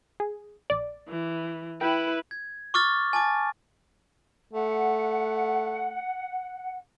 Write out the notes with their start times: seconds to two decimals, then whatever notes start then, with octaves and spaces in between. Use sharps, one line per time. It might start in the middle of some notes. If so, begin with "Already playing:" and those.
0.20 G#4
0.70 A#1 D5
1.09 E3
1.81 E4 B4 G5
2.31 G#6
2.74 C#6 D6 F6 A6
3.13 G#5 A5 D6 A6
4.54 A3 F#5